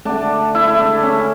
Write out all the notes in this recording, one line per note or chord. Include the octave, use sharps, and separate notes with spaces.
D3 A3 D4
E4
E4
D4
C#4